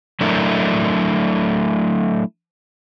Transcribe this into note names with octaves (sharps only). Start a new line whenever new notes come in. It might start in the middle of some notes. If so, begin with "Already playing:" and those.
F#3 A3 D4 E4 A#4